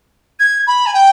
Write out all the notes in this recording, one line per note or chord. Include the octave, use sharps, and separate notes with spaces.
G#6
B5
G#5
G5